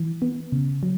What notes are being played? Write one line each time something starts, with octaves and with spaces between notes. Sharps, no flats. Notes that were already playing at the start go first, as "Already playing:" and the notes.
Already playing: E3
B3
C#3
F#3